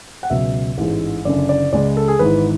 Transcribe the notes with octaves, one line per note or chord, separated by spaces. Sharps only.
F#5
C#2 B2 F#3 E5
A1 G#2 E3 G#3
F#1 F#2 D3 D5
D5
C#2 C#3 G#3 D5
A4
G#4
G#1 G#2 E3 B4